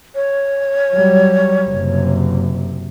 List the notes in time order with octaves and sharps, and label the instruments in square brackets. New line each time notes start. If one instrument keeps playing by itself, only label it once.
[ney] C#5
[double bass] F#3 G3
F#1 C3